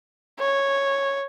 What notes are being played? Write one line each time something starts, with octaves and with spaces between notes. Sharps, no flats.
C#5